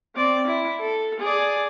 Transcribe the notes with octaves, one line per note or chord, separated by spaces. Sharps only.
C4 D5
E4
A4
G#4 D5